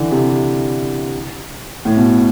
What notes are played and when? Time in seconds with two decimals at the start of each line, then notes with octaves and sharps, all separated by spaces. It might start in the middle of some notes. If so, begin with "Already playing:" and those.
Already playing: D3 E3
0.11 C3
1.85 A2
1.97 B2